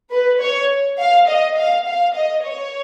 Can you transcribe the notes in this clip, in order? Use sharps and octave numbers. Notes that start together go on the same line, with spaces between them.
B4
C#5
F5
D#5
F5
F5
D#5
C#5